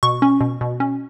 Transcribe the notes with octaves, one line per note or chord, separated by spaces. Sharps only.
B2 C#6
C#4
B2
B2
C#4